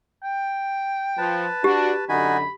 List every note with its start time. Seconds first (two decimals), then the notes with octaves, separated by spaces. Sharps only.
0.23 G5
1.18 F3 B4 A5
1.64 D4 F#4 G4
2.09 F#2 D3 D#4 F#4 G#5 B5